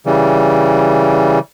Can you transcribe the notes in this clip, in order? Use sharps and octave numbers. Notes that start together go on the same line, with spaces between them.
C#3 E3 G3